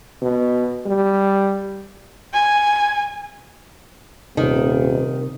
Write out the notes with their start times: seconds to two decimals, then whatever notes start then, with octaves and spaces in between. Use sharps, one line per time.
0.22 B2
0.86 G3
2.33 G#5
4.37 D#1 C3 D#3 D#4